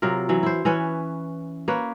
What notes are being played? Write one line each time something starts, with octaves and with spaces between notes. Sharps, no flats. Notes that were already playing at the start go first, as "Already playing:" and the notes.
C3 F#3 F4 A#4
E3 F#3
E4 C5
E3 C#4 B4 C#5
A#3 B4 C#5